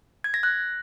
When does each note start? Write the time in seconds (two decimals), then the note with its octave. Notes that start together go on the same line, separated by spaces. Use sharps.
0.24 G#6
0.34 A#6
0.43 F#6